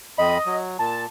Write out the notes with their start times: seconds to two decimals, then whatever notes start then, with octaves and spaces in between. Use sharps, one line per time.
0.18 F2 D#5 B5
0.46 F#3
0.79 A#2 A5